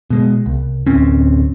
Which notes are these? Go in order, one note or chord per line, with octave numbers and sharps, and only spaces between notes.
B2 G#3
C2
D1 C4 C#4